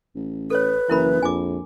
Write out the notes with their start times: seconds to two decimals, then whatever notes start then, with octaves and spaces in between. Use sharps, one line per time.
0.15 A1
0.50 A4 B4 C#5
0.89 F#1 E3 E4 A#4 B5
1.22 A#1 F2 G#5 D6